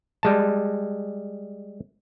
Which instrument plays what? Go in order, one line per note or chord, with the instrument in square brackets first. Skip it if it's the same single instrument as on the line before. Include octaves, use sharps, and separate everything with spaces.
[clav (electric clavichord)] G3 G#3 A5